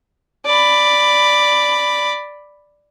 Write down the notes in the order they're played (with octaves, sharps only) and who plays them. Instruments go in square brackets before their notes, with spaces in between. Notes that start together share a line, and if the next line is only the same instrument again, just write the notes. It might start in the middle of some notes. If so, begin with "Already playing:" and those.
[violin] D5 B5